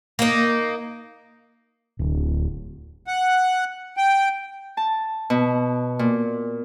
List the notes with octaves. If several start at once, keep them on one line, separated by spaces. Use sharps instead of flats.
A#3 D#4
D1
F#5
G5
A5
B2
A#2